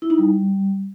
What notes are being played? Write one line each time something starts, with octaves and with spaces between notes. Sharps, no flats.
E4
D#4
G3